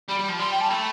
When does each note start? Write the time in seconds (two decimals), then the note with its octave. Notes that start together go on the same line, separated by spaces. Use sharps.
0.09 G3 B5
0.19 G3
0.25 F3 B5
0.39 G3 C6
0.51 G5
0.61 A5
0.69 A3 B5